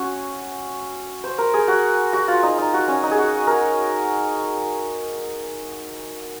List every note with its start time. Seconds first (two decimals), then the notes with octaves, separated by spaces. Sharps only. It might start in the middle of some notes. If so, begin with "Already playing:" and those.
Already playing: C#4 F#4
1.24 C5
1.38 A#4
1.54 G#4
1.68 F#4
2.13 F#4
2.28 F4
2.43 D#4
2.58 D#4
2.74 F#4
2.88 C#4
3.03 D#4
3.11 G#4
3.18 F#4
3.47 A#4